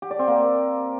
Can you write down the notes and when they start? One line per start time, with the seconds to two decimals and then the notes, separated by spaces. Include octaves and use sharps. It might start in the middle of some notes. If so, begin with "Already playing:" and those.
0.02 G4
0.11 D5
0.19 C4
0.28 A#3